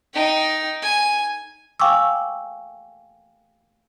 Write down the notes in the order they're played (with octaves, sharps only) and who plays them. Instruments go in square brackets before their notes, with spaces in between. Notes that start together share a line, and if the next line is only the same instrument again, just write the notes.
[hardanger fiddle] D#4 G5
G#5
[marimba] F5 G5 G#5 C#6 D6 E6